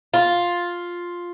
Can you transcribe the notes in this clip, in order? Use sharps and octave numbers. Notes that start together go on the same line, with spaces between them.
F4